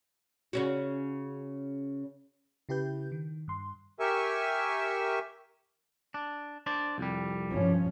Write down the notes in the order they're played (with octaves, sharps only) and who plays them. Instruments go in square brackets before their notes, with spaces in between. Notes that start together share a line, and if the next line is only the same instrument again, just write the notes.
[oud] C#3 C#4 F#4
[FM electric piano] C#3 E4 G4 B4 G6
D#3
G2 C6
[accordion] G4 A#4 E5 G#5 C#6 E6
[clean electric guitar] D4
D4 C5 D5
C2 F2 G3
[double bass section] G2 F3 C#4